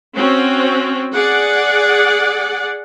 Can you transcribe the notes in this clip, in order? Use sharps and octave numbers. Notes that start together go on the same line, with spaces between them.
C4 C#4 F#4
G#4 D5 F#5